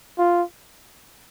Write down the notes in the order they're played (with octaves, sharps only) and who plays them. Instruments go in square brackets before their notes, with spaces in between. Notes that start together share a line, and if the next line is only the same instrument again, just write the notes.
[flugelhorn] F4